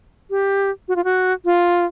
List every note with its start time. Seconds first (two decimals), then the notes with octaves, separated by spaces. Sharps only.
0.30 G4
0.88 F#4
0.96 F4
1.04 F#4
1.45 F4